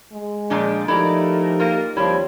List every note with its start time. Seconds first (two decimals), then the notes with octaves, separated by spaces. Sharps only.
0.12 G#3
0.50 A#2 F3 D4
0.88 F3 A3 D#4 E4 G4 A#4 D5 A#5
1.60 A#3 F4
1.97 D#2 F3 G3 C4 E4 C#5